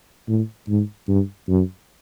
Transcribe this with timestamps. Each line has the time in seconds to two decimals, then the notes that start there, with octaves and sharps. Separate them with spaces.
0.28 A2
0.68 G#2
1.08 G2
1.49 F#2